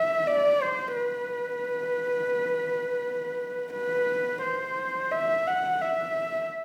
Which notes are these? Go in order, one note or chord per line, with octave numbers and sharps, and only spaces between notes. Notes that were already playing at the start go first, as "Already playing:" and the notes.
Already playing: E5
D5
C5
B4
B4
C5
E5
F#5
E5